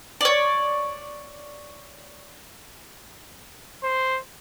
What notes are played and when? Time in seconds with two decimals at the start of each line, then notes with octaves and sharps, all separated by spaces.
0.21 C#5 D5
3.83 C5